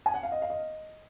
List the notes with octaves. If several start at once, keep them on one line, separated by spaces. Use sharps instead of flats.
G#5
F#5
F5
D#5
F5
D#5